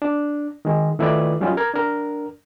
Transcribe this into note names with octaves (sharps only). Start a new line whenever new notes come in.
D4
D#3 G#3
D#3 A3 E4 F4 B4 D5
F#3 G3 C#4 D#4 F4
A#4 G#6
D4 A#4